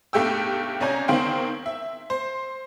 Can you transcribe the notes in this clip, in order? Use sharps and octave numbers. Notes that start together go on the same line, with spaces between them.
B1 G2 A3 G4 G5 E6
C2 C#4 D5 G#5 A#5 G6
E2 D#3 C4 F5 G5 C6
E5
C5